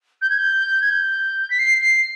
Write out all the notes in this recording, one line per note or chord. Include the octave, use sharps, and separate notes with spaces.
G6
G#6
G6
G#6
G6
B6
C7
C7